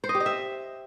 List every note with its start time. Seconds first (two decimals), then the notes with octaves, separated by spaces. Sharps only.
0.04 C5
0.09 D#5
0.15 G4
0.20 D#5
0.26 E5